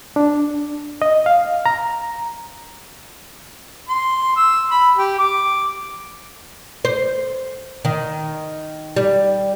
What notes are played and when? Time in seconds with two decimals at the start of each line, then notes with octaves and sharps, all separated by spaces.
0.16 D4
1.02 D#5
1.26 F5
1.66 A#5
3.89 C6
4.36 E6
4.71 B5
4.97 G4
5.19 D6
6.85 C5
7.85 D#3
8.96 G3